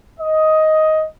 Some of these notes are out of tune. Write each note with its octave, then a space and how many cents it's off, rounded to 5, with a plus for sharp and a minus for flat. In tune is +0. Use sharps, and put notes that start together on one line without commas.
D#5 +10